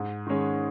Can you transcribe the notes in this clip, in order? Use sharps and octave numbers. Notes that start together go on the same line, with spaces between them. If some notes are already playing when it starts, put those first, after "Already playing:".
Already playing: G#2
D#3 G#3 C#4